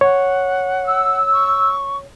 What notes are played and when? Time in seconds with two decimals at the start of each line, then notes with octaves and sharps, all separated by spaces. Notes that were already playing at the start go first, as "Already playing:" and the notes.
0.01 C#5 F#5
0.85 E6
1.33 C#6